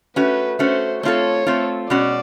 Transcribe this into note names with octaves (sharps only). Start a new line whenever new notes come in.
A3 C#4 F#4 B4
A3 C#4 F#4 C5
A3 C4 F4 A4 C#5
A3 C4 F4 A4
B2 G#3 C#4 F#4 D5